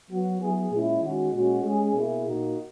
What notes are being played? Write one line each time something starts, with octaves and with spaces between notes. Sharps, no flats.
F#3 B3 F#4
F#3 B3 E4 G#4
A#2 G#3 C#4 E4
D#3 G#3 C#4 F#4
A#2 G#3 C#4 F#4
G#3 C#4 G#4
B2 A#3 E4 G#4
A#2 A#3 D#4 F#4